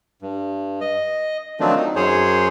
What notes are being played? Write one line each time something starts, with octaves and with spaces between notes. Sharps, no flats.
G2
D#5
D#3 F3 F#3 A3 C4 D4
D#4
F#2 G#4 C5 C#5